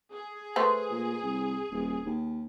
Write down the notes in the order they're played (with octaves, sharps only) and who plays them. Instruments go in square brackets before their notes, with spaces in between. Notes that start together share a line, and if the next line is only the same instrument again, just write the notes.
[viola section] G#4
[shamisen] A3 B4 C5
[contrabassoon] A#2
C2
D#1
D#2